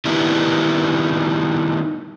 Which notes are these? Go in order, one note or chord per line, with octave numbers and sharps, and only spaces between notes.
D#3 G3 B3 D4 E4